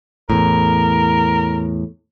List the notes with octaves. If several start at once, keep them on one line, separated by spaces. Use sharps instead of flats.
E2 A2 A#4